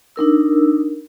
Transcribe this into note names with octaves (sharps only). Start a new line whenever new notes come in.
D4 D#4 A#4 E6